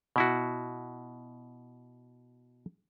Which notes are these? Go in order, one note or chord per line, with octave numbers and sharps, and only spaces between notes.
B2 E4 F#4